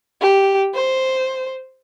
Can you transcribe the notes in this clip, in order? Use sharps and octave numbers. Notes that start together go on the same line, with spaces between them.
G4
C5